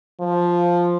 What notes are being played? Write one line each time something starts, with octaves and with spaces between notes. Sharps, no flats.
F3